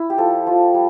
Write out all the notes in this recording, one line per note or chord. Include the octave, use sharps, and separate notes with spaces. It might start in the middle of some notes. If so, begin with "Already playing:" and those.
Already playing: E4
G4
F3 A4
F3
G3